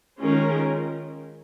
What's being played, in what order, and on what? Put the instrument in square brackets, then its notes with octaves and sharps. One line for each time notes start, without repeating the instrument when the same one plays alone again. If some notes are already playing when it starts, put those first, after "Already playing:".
[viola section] D#3 G#3 C#4 F4 A#4